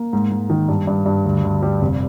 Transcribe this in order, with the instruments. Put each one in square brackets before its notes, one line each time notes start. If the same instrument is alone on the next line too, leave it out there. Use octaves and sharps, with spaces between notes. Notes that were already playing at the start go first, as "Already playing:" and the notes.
Already playing: [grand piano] A#3
G#2
G#2
D#3
G2
G2
G2
D2
D2
G3
F1